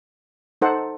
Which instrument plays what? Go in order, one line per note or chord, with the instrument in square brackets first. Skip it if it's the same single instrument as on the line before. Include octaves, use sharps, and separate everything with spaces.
[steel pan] D#4 A4 C5 F#5